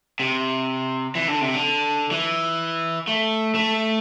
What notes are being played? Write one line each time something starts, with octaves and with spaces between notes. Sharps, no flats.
C3
E3
D3
C3
D3
E3
A3
A3